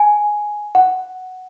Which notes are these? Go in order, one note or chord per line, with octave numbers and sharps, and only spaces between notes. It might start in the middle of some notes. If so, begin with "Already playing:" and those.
Already playing: G#5
F#5